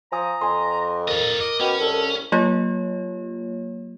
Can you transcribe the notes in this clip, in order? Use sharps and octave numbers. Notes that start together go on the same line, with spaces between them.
F3 G#5 A#5 D#6
F2 G#5 C6
F4 A#4 D#5
D#5 D6
B2 C#4 G5
C2 A4
F#3 A#3 F4 G4 C#5